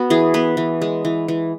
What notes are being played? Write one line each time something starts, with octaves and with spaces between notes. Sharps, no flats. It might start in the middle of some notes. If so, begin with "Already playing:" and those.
Already playing: B3 F#4
E3 G#4
B3 B4
E3
G#3
E3
E3